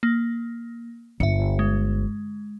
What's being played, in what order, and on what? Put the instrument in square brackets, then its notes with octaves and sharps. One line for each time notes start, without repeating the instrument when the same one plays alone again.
[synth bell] A#3
[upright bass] G1 [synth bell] E5 C#7
[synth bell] G#3